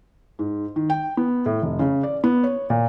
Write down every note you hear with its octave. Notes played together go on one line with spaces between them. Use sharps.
G#2
D#3
G5
B3
A2
F1
C#3
D5
B3
C#5
A#2